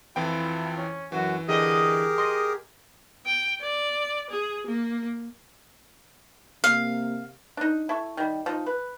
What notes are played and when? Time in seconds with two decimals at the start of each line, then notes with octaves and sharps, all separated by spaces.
0.16 F2 E3 E4 F4 G5
0.77 C#4
1.12 F#2 E3 F#4
1.48 D3 E3 G4 G#4 A#4 D#5
2.18 D#5 C6
3.26 G5
3.60 D5
4.29 G#4
4.66 A#3
6.64 C3 A#3 F5
7.57 D4 D#4
7.89 E4 A4 C#6
8.17 D#3 G3
8.46 F3 D#4
8.66 B4